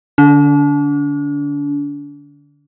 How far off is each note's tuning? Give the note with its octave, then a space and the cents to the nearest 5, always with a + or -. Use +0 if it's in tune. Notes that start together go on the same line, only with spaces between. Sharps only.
D3 +0 D4 -35